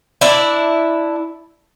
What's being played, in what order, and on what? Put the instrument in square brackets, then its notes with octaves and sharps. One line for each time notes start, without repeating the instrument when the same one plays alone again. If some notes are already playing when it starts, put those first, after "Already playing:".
[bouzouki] D4 E4 D5